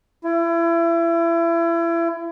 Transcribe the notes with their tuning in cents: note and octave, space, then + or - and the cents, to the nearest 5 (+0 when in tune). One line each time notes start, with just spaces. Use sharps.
E4 +30